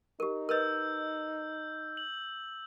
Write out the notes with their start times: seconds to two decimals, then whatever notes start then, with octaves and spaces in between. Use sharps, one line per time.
0.20 D#4 G4 A#4
0.49 A#4 B4 D#5 E6 G6
1.97 F#7